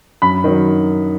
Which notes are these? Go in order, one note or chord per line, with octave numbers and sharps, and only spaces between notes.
F#2 B5
D#3 F#3